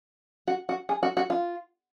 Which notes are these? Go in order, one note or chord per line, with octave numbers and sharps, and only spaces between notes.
F#4
F#4
G#4
F#4
F#4
F4